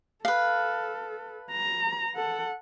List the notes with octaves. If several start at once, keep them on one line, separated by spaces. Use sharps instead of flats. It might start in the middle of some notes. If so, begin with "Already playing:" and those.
A4 B4 F5
A#5
A4 F#5